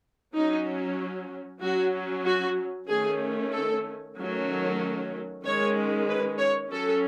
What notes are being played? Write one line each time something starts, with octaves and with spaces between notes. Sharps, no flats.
F#3 C#4 D#4
F#3 C#4 F#4
F#4
D#3 A3 C#4 G#4
A4
D#3 F#3 A3 C#4
D#3 G#3 C#4 C#5
B4
C#5
F#3 C#4 A4